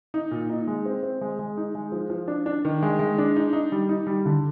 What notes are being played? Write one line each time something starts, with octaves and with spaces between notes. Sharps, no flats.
D#4
A#2
D#4
G#3
C4
C4
G#3
G#3
D#4
G#3
F3
F3
D4
D4
D#3
G#3
G#3
D4
D#4
D#4
G3
D#4
G3
D3